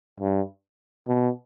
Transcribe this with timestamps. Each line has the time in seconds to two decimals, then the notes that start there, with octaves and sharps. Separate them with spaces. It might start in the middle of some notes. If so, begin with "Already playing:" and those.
0.20 G2
1.08 B2